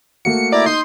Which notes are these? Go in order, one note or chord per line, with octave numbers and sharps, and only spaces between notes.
A3 A#3 F#4 C#7
E4 D5 A#5
D#4 C6 D#6 G6